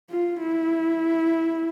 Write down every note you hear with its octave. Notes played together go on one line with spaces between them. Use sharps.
F4
E4